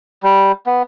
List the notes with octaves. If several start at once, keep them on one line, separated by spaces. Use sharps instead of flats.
G3
B3